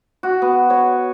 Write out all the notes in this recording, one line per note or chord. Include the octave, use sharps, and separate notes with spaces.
F#4
B3
C#5